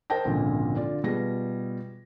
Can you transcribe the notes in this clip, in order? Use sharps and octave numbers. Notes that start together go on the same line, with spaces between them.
A#4 C5 D#5 G5 A5 A#6
G#1 C#2 A#2 D3 F3
D3 F4 D5
B2 G3 F4 G#4 A#6